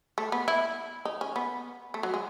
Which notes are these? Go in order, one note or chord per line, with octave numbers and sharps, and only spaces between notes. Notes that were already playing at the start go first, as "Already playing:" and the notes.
A3
B3
E4
D#4
C#4
B3
A3
F#3
G#3